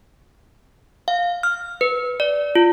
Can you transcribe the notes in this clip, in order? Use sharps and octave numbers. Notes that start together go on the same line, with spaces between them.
F5
F6
B4
D5
F4